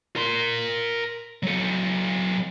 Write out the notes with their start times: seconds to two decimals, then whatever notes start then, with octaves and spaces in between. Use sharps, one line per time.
0.16 A#4 C6
1.43 F#3 A4